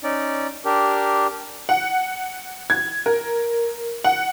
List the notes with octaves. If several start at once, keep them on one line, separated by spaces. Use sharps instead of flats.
C#4 D#4 D5
D4 G4 A#4
F#5
G#6
A#4
F#5